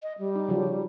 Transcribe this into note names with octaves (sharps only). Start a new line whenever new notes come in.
D#5
G3
D#4
C#3 F3 F#3